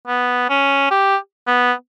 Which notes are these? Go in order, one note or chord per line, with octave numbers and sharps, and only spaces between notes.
B3
C#4
G4
B3